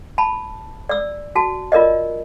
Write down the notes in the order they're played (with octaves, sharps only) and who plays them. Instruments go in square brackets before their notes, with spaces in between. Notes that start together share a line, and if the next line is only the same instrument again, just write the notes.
[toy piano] A5 B5
D5 E6
F#4 A5
F4 A#4 D5 D#5